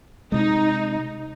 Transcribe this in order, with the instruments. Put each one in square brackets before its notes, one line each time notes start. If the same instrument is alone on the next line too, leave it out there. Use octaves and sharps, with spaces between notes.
[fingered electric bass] C3 G#3 [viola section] D#4